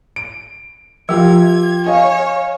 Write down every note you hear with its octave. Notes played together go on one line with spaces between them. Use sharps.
D7
F3 F4 G4 A#4 G#6
C#5 D#5 F5 G#5